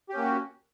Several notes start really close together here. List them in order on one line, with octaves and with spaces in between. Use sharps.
G4 C#4 A#3 F#4